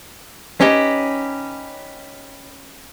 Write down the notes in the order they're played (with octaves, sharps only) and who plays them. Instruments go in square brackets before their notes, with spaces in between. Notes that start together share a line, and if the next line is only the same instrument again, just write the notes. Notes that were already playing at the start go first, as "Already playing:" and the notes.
[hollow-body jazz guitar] C#4 [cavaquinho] D#4 G4 B4